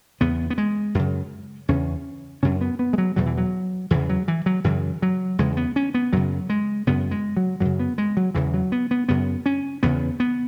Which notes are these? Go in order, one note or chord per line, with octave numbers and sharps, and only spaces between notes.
E2 C#3 B3
B3
G#3
F#2 C#3
E2 C#3 C#4
F#2 C#3 C#4
B3
B3
G#3
F#3
E2 B2 F#3
E3
F#3
E2 C#3 E3
F#3
E3
F#3
F#2 C#3 E3
F#3
E2 C#3 G#3
B3
C#4
B3
F#2 C#3 F#3
G#3
F#2 C#3 B3
G#3
F#3
F#2 C#3 F#3
B3
G#3
F#3
E2 C#3 E3
F#3
B3
B3
F#2 C#3 B3
C#4
E2 C#3 B3
B3